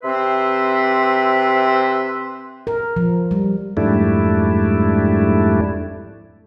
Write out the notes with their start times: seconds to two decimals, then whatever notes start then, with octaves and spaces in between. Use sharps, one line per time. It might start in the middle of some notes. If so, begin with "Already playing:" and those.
0.04 C3 C4 B4 E5 C6
2.67 A#4
2.96 F3
3.31 G3
3.77 F2 G#2 G3 A3 D4 E4